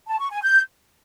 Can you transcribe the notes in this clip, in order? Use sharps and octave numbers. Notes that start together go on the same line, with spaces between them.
A5
C#6
G#5
G6